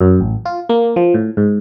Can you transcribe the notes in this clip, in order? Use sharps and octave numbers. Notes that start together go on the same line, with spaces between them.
F#2
A1
F4
A#3
F3
A2
G#2